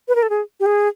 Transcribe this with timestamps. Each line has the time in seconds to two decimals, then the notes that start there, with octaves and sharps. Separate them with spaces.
0.08 B4
0.15 A#4
0.23 A4
0.30 G#4
0.60 G4
0.66 G#4